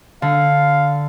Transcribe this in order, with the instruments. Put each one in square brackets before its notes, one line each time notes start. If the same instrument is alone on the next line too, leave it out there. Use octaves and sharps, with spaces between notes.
[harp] D3 [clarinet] F5